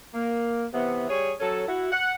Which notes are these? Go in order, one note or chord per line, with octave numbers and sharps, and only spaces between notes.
A#3
C3 E3 B3
G3 G#4 C#5
F#3 C#4 A4
E4 F#4
F#5